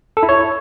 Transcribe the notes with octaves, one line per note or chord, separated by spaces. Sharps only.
A4
E4
C#5